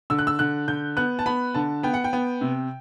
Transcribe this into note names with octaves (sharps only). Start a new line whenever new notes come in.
D3 E6
F#6
E6
D3 F#6
D3 G6
B3 F#6
A5
B3 B5
D3 A5
B3 G5
F#5
G5
B3
C3